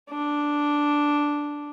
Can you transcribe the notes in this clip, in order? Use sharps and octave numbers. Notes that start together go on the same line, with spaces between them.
D4